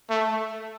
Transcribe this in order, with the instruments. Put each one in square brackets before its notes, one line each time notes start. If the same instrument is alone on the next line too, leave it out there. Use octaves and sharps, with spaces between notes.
[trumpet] A3